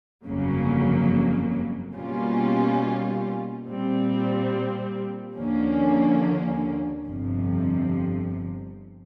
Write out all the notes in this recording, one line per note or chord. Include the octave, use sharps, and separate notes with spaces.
G1 F2 C#3 F#3 A#3
B2 G3 A#3 C#4 F4
A#2 G3 C4
D#2 D3 F3 A#3 C#4
G1 F2 C3 F3